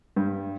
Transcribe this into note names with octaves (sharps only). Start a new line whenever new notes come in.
G2